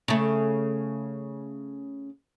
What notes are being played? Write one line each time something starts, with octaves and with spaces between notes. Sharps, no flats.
C#3 A3